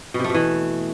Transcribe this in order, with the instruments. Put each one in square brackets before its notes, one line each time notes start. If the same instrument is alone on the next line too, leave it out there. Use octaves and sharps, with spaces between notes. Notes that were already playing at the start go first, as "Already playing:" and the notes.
[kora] B2
C3
A3
B2
E3